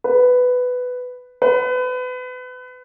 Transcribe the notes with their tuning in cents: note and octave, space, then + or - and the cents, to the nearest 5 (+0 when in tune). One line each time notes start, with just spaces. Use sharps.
B4 +10
B4 +30